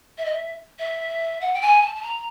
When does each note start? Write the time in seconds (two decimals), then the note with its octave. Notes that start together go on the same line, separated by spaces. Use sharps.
0.18 E5
0.25 D#5
0.32 E5
0.79 E5
1.41 F#5
1.53 G5
1.61 G#5
1.82 A5
1.95 A5
2.02 A#5